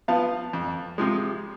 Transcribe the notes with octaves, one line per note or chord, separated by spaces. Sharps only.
F3 B3 F5 A5
F2
C3 F3 G#3